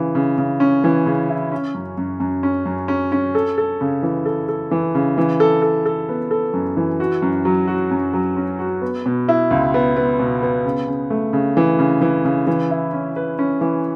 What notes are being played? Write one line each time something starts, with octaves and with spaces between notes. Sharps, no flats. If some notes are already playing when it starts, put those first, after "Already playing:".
Already playing: C#3 E3
C#3
C#3
C#4
E3
C#3
E4
C#4
F#2
F#2
F#2
C#4
F#2
C#4
C#4
A4
A4
C#3
E3
A4
A4
E3
C#3
E3
A4
A4
A4
B3
A4
F#2
E3
F#4
F#2
F#3
F#4
F#2
F#3
C#4
F#4
B3
B2
E4
C#2
B3
B3
B2
B3
C#3
C#3
A3
C#3
E3
C#3
E3
C#3
E3
E4
C#4
B4
C#4
E3